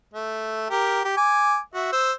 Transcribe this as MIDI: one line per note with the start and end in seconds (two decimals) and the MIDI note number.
0.14 0.68 57
0.70 1.00 67
0.70 1.00 70
1.04 1.15 67
1.17 1.58 80
1.17 1.58 86
1.74 1.89 66
1.74 1.89 76
1.93 2.12 72
1.93 2.12 88